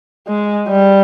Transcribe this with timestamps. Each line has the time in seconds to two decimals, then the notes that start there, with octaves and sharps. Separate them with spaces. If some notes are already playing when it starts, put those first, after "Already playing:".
0.27 G#3
0.69 G3